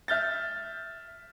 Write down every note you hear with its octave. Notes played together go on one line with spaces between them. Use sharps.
E5 F6 G6 A6